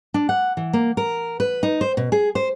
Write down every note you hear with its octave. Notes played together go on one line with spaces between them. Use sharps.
D4
F#5
E3
A#3
A#4
B4
D#4
C5
B2
G#4
C5